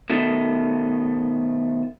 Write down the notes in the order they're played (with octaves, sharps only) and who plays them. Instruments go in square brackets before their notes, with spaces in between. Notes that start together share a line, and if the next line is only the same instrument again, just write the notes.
[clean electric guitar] B2 D#3 A3